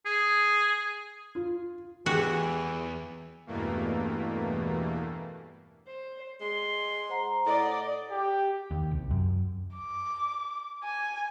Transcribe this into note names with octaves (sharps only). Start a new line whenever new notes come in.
G#4
F4
E2 E3 G#3 F#4 G4
E2 G2 B2 E3 A3 A#3
C5
G#3 C6
C5 F#5 A#5
A2 D5 D#5
G4
D#2
C2
F#2
D6
G#5